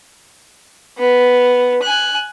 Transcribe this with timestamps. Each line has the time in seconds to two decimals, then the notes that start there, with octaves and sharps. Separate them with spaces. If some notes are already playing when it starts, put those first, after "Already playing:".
0.98 B3
1.82 G#5 F#6